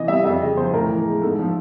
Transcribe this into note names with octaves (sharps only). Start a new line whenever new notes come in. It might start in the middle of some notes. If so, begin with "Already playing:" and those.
Already playing: C3 E3 D#5
G3 E5
F2 E5
C#3 D#5
F3 C5
A2 A#4
E3
G#3
G#2 A4
F3